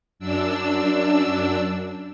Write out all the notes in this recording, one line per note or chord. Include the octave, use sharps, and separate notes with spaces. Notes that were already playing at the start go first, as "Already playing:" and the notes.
F#2 D4 E6